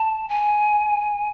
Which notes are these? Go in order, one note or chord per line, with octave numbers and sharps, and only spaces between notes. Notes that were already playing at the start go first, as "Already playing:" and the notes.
Already playing: A5
G#5